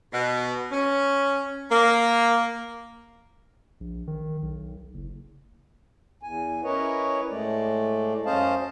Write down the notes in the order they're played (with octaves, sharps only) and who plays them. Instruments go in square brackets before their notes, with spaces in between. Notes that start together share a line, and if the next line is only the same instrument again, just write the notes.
[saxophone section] B2
C#4
A#3
[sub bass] A#1
D#3
B1
F#1
[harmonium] E2 G#5
C#4 E4 A#4 B4 C#5 D#5
A2 G#3 A3 D5
F#2 C#4 C5 D#5 F5 A5